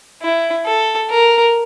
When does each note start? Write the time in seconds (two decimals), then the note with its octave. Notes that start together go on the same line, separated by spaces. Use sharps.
0.22 E4
0.66 A4
1.10 A#4